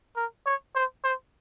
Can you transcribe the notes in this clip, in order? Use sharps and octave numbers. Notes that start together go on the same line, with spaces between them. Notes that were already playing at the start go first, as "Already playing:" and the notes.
A#4
C#5
C5
C5